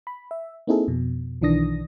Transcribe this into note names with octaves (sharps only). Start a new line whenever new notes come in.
B5
E5
A#3 C4 D#4 E4 G#4 A4
F2 B2
B1 D#3 E3 D4 D#6 A#6